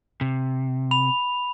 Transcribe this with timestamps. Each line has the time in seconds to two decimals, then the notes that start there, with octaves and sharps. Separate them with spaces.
0.21 C3
0.91 B5 F7